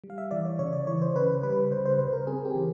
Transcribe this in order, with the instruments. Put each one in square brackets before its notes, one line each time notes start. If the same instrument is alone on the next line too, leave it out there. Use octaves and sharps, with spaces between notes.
[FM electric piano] G3
F5
E5
E3 D5
C#5
C#3 C#5
D5
E3 C#5
C5
C#3 B4
G3 B4
C#3 C5
C5
C#3 B4
A#4
C4 G#4
G4
E3